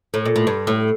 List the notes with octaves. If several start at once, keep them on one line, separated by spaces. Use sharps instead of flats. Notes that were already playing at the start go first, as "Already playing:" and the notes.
A2
A#2
A2
G2
A2